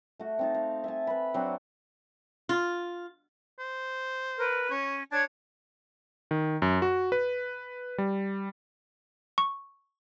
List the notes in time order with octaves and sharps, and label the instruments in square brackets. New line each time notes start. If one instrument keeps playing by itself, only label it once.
[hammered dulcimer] A3 F#4
C4 D#4 A5
F5
E5 G#5 A5
B4 B5
F#3 C4 D4
[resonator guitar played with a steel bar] F4
[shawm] C5
[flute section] A#4 B4
[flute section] C#4 [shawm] C#5
[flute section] D4 C#5 G#6 [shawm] A5
[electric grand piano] D#3
F#2
F#4
B4
G3
[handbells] C#6